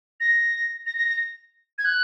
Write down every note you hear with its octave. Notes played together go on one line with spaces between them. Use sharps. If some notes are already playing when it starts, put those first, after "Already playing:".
A#6
A#6
A#6
A#6
G#6
F#6